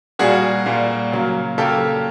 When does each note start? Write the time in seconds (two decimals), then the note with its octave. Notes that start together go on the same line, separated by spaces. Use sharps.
0.19 A#2 G3 A#3 F#4 G#4
0.66 A#2 G3 A#3
1.12 C#3 F#3 A#3
1.58 C#3 F#3 A#3 G4 A4